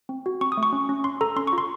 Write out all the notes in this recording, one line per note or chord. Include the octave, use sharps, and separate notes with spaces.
C4
F#4
C4 C#6
D#6
A3
C#6
C#4
C#4
C#4 C6
A4 A#5
C#4 C6
C#6
F4
C6